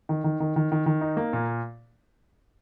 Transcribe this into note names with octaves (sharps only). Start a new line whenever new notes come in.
D#3
D#3
D#3
D#3
D#3
D#3
D#4
A#3
A#2